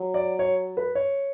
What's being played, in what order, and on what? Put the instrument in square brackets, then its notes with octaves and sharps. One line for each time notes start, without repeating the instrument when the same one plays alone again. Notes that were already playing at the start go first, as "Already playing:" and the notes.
Already playing: [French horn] F#3
[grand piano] D5
C#5
B4
C#5